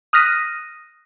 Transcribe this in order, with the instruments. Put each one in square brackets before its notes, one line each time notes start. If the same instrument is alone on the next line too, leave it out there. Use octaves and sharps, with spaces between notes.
[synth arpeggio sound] D#6 F6 F#6 A#6 B6 D#7